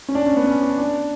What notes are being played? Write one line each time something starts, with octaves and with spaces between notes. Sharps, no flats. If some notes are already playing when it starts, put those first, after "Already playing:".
C#4
D4
C#4
B3
C#4
D4
D4